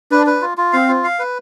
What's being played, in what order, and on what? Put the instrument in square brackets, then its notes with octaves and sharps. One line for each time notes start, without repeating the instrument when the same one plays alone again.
[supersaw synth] D4 [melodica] B4
[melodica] B4
F4
F4
[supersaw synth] C4 [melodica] F5
[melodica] F4
F5
B4